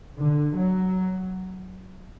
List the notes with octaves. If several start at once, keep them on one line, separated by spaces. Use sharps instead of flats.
D3
F#3